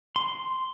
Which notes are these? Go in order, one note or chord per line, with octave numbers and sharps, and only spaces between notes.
C6